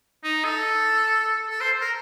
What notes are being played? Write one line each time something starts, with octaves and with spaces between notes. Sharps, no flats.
D#4
A4
A4
C5
A#4